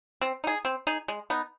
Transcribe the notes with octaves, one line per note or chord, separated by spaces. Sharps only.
C4
D#4 G#4
C4
D#4 G#4
G#3
B3 D#4